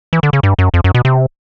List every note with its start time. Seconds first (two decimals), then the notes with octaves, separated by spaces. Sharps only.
0.13 E3
0.23 D3
0.33 C#3
0.43 G2
0.59 F#2
0.74 F2
0.84 F#2
0.95 B2
1.05 C3